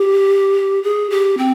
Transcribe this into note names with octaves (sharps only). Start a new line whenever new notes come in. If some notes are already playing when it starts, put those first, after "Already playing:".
Already playing: G4
G#4
G4
C4